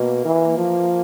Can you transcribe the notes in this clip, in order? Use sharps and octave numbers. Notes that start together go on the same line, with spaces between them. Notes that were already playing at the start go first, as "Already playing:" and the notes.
Already playing: B2 A#3
E3
F3